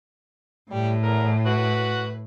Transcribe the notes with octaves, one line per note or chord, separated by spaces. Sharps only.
A2 G3
E2 A#4
F#4 B4